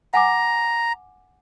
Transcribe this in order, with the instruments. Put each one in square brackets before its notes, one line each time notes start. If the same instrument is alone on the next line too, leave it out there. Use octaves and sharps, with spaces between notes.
[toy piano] F#5 G#5 D6 [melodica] A#5